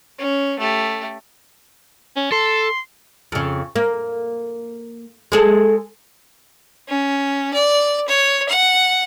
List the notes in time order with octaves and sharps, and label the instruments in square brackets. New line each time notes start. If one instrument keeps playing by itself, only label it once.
[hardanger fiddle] C#4
A3 G4
[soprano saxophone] C#4
[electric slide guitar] A4 [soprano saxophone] C6
[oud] F2 C#3
A#3
G#3 G#4 A4
[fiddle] C#4
D5
C#5
F#5